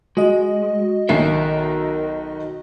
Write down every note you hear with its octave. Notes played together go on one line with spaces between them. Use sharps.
G#3 F#4 D#5
B1 D#3 A#4 E5 C7